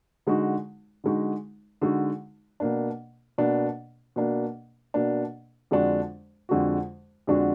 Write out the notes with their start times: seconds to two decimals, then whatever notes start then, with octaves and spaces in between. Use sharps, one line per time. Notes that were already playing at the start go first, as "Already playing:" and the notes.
0.27 D3 G#3 D#4 F#4
1.04 D3 G#3 D#4 F#4
1.82 D3 G#3 D#4 F#4
2.60 B2 A#3 D4
3.38 B2 A#3 D4
4.16 B2 A#3 D4
4.94 B2 A#3 D4
5.71 F2 D3 G#3 D4 F#4
6.49 F2 D3 G#3 D4 F#4
7.27 F2 D3 G#3 D4 F#4